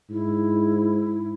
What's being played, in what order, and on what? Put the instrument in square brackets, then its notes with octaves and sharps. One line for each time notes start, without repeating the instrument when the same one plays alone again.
[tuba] G#2 [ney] E4